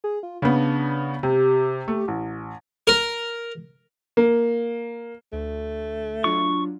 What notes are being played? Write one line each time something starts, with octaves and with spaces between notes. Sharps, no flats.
G#4
F4
C#3 B3 D4
C3 G4
A3
A1
A#4
A#3
D2 A3
F#3 D4 F4 C#6